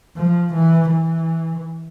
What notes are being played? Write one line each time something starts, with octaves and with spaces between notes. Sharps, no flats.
F3
E3
E3